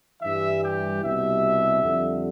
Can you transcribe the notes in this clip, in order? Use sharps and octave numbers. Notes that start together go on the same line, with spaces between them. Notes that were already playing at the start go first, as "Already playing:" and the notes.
G2 E3 G3 E5
G4
C2 B2 G3 E5
F2 D3 G3